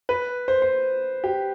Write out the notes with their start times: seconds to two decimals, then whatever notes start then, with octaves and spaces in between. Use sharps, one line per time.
0.09 B4
0.48 C5
0.62 C5
1.24 G4